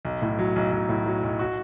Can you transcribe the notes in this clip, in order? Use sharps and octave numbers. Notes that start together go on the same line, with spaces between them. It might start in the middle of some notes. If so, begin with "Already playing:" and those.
B1
A2
F#3
B1
B1
A2
F#3
B1
F#4